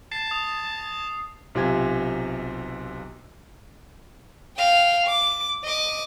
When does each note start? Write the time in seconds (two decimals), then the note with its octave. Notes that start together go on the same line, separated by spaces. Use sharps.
0.12 A5 C7
0.31 D#6
1.55 B1 C3 F4 G4 G#5 G#6
4.57 F5 G5
5.06 D6
5.64 D#5 D6